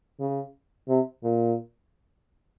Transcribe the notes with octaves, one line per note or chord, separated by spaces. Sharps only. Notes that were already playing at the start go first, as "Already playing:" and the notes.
C#3
C3
A#2